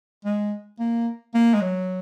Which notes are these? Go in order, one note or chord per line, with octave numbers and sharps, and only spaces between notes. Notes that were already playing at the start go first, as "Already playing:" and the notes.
G#3
A#3
A#3
G#3
F#3